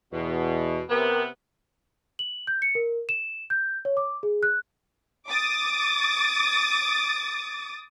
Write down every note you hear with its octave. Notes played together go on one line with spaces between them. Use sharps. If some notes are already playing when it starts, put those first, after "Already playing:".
E2 B2
C3 B3 A#4
F#7
G6
C#7
A#4
E7
G6
C#5
D6
G#4
F#6
D6 D#6 A6